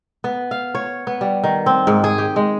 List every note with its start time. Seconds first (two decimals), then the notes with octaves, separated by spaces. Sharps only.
0.24 B3
0.51 F5
0.75 C#5
1.07 B3
1.21 G3
1.44 D#3
1.66 C4
1.87 G#2
2.04 G#4
2.18 G4
2.36 G#3